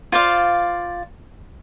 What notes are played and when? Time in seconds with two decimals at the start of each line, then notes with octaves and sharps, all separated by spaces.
0.12 F4 C5 D5 F5